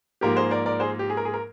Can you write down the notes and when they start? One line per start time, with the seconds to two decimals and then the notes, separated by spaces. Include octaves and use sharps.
0.21 G#2 F3 A#3 G4 A#4
0.36 G#4 C5
0.51 A#4 D5
0.66 A#4 D5
0.80 G#4 C5
0.99 G4
1.10 G#4
1.17 A#4
1.25 G#4
1.34 A#4